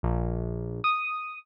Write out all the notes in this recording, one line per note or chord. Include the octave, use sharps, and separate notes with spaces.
A#1
D#6